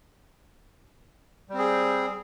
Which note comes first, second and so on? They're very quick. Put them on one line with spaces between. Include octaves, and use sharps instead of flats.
G3 C4 G#4